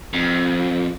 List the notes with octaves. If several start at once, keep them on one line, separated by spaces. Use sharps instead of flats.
F2